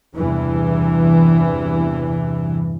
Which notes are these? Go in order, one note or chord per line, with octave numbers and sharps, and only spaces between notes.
E2 G2 C3 E3